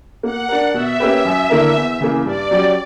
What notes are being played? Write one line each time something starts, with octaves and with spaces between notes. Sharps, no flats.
A#3 F#5
D4 A#4
B2 E5
A#3 C#4 G4 B4
F#2
D3 A#3 E4 A#4
E2
C#3 E3 A#3
G2 D5
F#3 C#4 G4